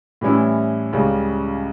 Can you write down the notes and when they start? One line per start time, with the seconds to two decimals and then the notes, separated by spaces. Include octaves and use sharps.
0.21 A2 E3 G3 C#4 E4
0.93 C#2 C#3 G3